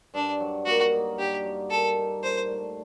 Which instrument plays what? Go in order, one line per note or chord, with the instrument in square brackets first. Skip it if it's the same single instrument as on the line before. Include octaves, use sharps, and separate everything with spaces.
[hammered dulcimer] G2 [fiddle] D4
[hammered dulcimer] F#3
[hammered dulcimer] A#3 [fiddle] F#4
[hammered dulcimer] D#4
[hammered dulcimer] G2 [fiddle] G4
[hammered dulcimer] F#3
[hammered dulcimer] A#3 [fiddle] A4
[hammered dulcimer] D#4
[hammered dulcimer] A#2 [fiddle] C5
[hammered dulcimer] A3